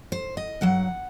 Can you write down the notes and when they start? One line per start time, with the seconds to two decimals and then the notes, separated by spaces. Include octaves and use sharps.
0.12 C5
0.37 D#5
0.61 G2 F#3 F#5